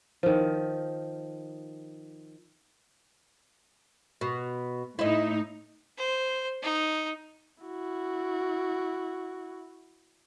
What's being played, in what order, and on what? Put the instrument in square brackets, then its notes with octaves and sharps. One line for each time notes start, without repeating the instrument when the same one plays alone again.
[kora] D#3 F3
[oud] B2
[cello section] A2 D#4 [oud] E4 D#5
[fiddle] C5
D#4
[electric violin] E4 F#4